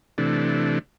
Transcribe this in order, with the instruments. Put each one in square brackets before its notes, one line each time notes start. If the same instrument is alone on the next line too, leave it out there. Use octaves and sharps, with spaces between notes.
[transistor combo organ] C3 E3 A3 D4